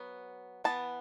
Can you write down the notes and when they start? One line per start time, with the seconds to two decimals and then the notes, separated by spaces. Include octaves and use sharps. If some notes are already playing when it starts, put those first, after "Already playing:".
Already playing: F#3 B3
0.64 E3 B3 A5